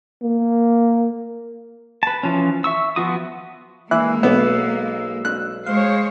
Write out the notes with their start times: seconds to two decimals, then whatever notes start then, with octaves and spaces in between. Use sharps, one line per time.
0.23 A#3
2.03 B4 A5
2.23 E3 F3 C#4
2.64 E5 C#6 E6
2.96 F3 B3 F4 F#4 D#6
3.91 E3 G#3 A#3 E5 F#6
4.23 B1 B3 E6
5.25 F#6
5.66 G#3 C5 C#5 F5